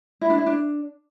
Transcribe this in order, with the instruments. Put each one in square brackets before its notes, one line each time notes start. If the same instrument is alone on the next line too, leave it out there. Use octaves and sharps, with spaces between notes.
[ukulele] E4
D4
E4
D4